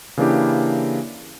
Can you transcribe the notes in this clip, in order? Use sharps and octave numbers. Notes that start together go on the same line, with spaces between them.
C#3 E3 A#3 D4 E4 G4